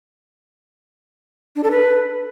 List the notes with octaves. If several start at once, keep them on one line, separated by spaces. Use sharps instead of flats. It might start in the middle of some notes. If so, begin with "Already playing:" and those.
D4
A4
B4